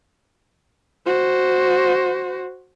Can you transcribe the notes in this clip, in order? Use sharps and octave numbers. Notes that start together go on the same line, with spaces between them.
F#4 C5